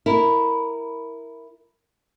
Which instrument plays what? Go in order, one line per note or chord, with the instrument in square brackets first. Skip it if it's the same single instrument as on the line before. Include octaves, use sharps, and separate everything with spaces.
[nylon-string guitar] E4 A#4